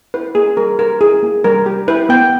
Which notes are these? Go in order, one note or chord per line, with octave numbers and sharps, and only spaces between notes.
E4 B4
A#3 G#4
G3 A#4
G4 A#4
E4 G#4
A#3
G3 A#4
G4
E4 B4
B3 G5